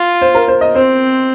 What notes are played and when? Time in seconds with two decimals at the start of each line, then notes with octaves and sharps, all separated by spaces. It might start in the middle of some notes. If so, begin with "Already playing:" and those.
Already playing: F4
0.21 C5
0.35 A#4
0.48 C5
0.61 D#5
0.75 C4 C5